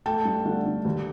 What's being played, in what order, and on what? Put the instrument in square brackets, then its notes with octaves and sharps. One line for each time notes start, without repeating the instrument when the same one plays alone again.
[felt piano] A3 G5 A5
G2
D3
D3
D#2